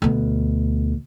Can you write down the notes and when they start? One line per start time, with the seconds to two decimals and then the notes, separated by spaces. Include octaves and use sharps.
0.02 D2 B2